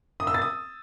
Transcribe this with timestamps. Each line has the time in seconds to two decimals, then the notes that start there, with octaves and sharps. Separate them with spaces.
0.20 D#6
0.27 E6
0.34 A6
0.42 D#6